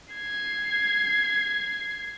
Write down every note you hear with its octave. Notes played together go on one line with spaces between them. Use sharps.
G#6 C7